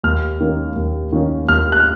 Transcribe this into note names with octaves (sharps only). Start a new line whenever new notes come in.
D#2 F6
D#3 A#3 C#4
D#2
D#3 A#3 C#4
D#2 F6
F#6
F6